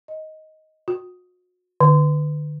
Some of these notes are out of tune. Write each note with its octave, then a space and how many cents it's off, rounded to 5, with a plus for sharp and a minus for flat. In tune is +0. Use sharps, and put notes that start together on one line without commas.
D#5 +10
F#4 -40
D3 +35